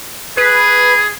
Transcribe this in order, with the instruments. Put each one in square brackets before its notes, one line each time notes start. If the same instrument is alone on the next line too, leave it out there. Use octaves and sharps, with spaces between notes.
[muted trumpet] G#4 [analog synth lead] B4